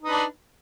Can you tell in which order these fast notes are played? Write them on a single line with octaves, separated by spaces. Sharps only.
D#4 B4 D4